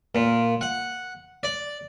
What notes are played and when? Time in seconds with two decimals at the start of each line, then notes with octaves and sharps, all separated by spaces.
0.15 A#2
0.61 F#5
1.43 D5